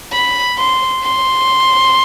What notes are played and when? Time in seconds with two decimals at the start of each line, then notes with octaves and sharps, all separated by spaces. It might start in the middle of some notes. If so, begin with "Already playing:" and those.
0.12 B5
0.58 C6
1.03 C6